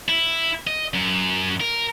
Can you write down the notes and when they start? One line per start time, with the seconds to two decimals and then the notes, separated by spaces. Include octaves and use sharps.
0.08 E4
0.67 D#5
0.94 F#2
1.61 A#4